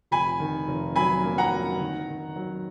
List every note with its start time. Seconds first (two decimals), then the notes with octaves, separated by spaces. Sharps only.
0.11 F1 G#5 B5
0.40 D#3
0.68 F1
0.96 F#3 G#5 B5
1.23 A#3
1.38 F#5 A#5
1.52 F#3
1.80 D#3
2.08 D#3
2.36 F#3